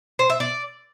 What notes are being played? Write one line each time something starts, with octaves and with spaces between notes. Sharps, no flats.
C5
E5
D5